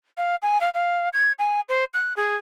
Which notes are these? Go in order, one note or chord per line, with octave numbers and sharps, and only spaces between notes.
F5
G#5
F5
F5
G#6
G#5
C5
F#6
G#4